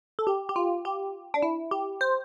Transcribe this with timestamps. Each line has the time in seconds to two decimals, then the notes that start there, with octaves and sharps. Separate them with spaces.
0.19 A4
0.27 G4
0.49 G4
0.56 F4
0.85 G4
1.34 D4
1.42 E4
1.71 G4
2.01 C5